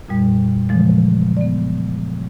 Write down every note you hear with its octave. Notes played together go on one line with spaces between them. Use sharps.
F2 A#2 G3
A#2 C#3 E3 F3 G#3
B3 D5